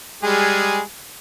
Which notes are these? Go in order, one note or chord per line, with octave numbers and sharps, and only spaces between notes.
G3 G#3 G#4